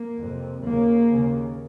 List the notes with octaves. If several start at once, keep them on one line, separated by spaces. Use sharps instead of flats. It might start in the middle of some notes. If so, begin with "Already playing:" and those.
Already playing: A#3
F2 C3
D#2 C#3 A#3
D#2 C#3